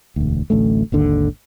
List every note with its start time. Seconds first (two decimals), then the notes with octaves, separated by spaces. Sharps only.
0.16 E1 D2
0.50 D1 A1 D2 A3
0.92 G#1 D#2 D3